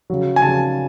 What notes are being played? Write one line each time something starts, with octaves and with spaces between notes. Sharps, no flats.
C#3 F#3
G#5
C#3 F#3 A5